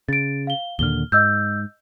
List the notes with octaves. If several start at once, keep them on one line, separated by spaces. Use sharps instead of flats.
C#3 A6 D7
F5 G7
D#2 A#2 D3 F6 G7
G#2 D#5 E6 G6